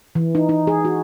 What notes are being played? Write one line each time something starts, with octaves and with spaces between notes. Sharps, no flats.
E3
D#4
D#4
G#4
F#4